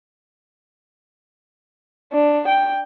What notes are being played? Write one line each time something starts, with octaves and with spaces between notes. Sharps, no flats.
D4
G5